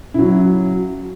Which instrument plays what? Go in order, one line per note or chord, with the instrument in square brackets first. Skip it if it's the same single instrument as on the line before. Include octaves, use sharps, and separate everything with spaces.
[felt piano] C#3 F#3 E4